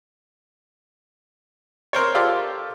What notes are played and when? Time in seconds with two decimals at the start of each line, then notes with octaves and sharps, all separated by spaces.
1.93 C4 A#4 C5 C#5
2.15 F4 G4 A4 D5 C6 D6